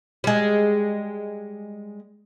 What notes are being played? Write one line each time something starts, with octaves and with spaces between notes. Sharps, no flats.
G3 G#3